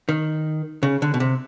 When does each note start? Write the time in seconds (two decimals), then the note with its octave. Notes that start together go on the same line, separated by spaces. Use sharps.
0.09 D#3
0.83 C#3
1.02 D3
1.14 B2
1.20 C3